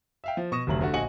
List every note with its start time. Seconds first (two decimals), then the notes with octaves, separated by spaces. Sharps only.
0.24 E5 F5 G5
0.37 F3
0.52 B2 C#6 D#6 A#6 E7
0.67 F1 D2 F#3 F#7
0.81 D3 A3 F#4
0.93 A#1 F#4 D#5 G#5 C#7 F#7